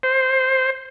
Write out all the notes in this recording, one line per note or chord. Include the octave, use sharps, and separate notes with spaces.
C5